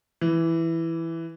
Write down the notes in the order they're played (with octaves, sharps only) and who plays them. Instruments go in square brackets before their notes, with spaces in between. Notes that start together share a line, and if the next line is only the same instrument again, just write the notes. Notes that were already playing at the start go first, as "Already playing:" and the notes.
[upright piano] E3